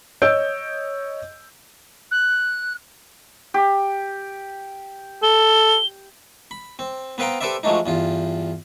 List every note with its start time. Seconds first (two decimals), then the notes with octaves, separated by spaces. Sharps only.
0.22 C#5 D#5 E6 G6 D7
2.11 F#6
3.54 G4
5.23 A4 G7
6.51 B5
6.79 C4
7.18 B3 C4 B4 F5 G5 A#5
7.41 G4 A4 B4 C5 D5 E5
7.63 F3 F#3 G#3 A3 D4 D#4
7.86 E2 G2 F4